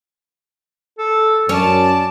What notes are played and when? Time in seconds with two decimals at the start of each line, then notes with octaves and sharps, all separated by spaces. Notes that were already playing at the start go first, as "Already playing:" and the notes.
0.98 A4
1.49 F#2 C#4 D5 A5